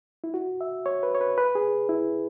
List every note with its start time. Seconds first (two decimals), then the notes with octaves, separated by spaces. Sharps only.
0.24 E4
0.34 F#4
0.61 E5
0.86 C#5
1.03 B4
1.15 C#5
1.21 B4
1.38 B4
1.55 G#4
1.89 E4